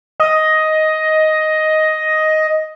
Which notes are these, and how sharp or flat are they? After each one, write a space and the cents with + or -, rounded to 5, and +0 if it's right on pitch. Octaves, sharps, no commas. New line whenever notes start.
D#5 +10